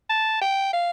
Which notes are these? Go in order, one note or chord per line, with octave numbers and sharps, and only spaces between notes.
A5
G5
F5